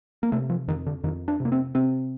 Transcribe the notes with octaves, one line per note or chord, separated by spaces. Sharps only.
A#3
C3 A3
F3
F2 D#3
D3
F2 D#3
D4
C3
A#3
C4
C3 C4